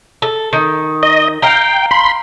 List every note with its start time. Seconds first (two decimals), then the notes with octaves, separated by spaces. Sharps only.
0.22 A4
0.53 D#3
1.03 D#5
1.42 F5 G5 A#5
1.91 B5 C6